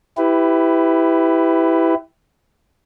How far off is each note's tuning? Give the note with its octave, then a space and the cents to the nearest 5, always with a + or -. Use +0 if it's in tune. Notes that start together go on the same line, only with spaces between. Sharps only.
E4 +0 G4 +0 B4 +20